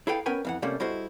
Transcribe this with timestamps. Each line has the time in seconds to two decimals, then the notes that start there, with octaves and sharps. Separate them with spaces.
0.07 E4 G#4 A4 B4 F5 G5
0.26 B3 C#4 A#4 B4 G5 G#5
0.45 F2 E3 F#5
0.62 C3 G3 A3 A#3 C#4
0.80 G3 E4 F#4 A4 C5 D#5